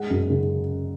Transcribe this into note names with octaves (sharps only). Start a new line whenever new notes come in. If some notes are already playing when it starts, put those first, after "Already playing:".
Already playing: G#3 F#5
F#2
C#3